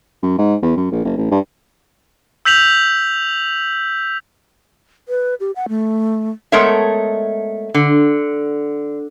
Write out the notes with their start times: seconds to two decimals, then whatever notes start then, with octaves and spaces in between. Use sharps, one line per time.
0.23 F#2
0.38 G#2
0.62 E2
0.77 F#2
0.92 A#1
1.04 F#1
1.17 A1
1.31 G2
2.45 E6 G6 B6 F7 F#7
5.09 B4
5.40 G4
5.56 F#5
5.69 A3
6.52 G#3 A3 B3 A#4 C#5 E5
7.74 D3